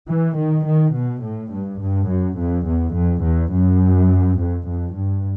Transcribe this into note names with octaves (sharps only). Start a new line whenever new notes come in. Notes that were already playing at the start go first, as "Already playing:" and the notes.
E3
D#3
D#3
B2
A2
G2
G2
F#2
F2
E2
F2
E2
F#2
F2
F2
G2